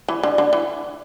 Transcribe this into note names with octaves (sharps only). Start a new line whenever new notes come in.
E3
D3
D3
E3